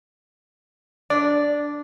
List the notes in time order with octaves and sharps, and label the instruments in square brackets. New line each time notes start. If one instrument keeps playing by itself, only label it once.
[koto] D4 [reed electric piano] D5